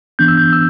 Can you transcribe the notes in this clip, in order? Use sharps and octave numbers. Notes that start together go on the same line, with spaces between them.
E3 B3 D4 G6
E6
G6
E6